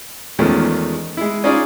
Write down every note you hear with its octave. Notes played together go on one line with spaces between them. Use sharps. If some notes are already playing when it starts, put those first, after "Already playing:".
E2 D#3 F3 G#3 A3 C#4
G#3 E4
C#4 D#4 F4 G#4 C#5 D5